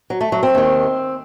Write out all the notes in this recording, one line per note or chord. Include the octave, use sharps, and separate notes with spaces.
F#3
A3
F#3
C4
D#2 D#3